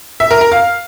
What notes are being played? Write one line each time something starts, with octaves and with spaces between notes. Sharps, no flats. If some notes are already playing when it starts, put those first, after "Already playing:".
E5
A#4
A#4
F5